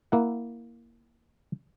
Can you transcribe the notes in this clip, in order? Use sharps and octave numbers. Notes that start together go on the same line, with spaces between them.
A#3 E4 F#5